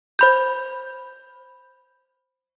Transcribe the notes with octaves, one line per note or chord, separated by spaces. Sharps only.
C5 B5 G6